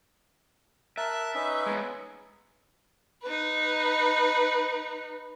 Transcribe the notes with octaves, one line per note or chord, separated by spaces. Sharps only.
A#4 E5 A5 F#6
C#4 D#4 B4
G#3 B3
D#4 B4